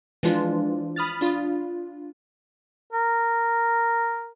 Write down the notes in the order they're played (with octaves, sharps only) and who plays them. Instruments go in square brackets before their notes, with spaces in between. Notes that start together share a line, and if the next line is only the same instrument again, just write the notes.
[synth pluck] E3 F3 G#3 D4 F4
B5 D#6 F6 A6
D4 F4
[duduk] A#4